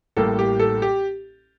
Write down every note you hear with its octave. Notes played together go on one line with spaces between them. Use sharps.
A1 A2 G3 A#3 A4
G4
A4
G4